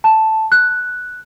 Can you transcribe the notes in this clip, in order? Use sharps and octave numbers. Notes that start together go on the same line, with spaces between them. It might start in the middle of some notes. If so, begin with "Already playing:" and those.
A5
F#6